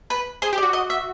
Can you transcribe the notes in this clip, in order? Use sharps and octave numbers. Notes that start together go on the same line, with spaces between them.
B4
G#4 C5
G4
D5
F#4
D#5
E5